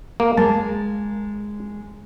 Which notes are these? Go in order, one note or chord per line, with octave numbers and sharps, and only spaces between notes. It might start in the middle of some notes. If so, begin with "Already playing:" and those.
A#3
G#3 A#4 A5